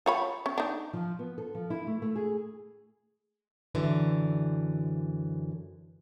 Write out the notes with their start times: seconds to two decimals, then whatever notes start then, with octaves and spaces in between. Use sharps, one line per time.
0.06 F4 C#5 B5
0.46 C#4
0.58 D4 D#4
0.93 F3
1.19 B3
1.38 A4
1.55 F3
1.70 E4
1.87 A3
2.02 A3
2.16 G#4
3.75 F#2 D3 E3